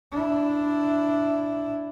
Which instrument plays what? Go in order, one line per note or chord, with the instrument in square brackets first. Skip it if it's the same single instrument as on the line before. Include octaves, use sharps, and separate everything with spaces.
[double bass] D4 E4